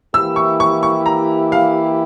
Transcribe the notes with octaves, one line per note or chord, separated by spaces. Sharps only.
E3 A#3 E4 G4 E6
C#6
C#6
C#6
A#5
F5